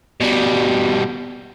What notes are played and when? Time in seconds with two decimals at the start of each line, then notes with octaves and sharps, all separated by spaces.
0.21 B2 G3